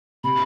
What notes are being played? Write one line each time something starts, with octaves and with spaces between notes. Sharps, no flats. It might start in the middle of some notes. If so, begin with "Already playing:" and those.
C3 B5